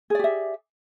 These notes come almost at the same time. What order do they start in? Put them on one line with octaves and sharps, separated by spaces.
G#4 D5 G4 E5